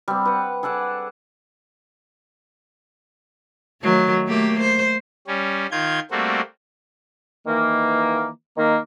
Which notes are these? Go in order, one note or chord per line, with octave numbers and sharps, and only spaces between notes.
G3 C4
B4 F#5
G#4 A4 D5 F#5
D#3 F#3 A3
A3 A#3 G4
C5
G3 C#4
D#3 F4 G6 G#6
G3 A3 A#3 C4 F#4
D#3 E3 A#3
D#3 A#3